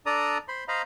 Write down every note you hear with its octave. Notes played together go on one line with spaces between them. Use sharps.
D4 A4 D5 A#5 D#6
C5 B5 C6
C5 D#5 F5 A#5 B5